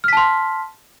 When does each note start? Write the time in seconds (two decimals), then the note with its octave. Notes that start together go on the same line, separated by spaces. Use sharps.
0.04 F6
0.08 B6
0.13 A5
0.17 C6